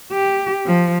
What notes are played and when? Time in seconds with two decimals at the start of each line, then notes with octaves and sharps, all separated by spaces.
0.12 G4
0.66 F3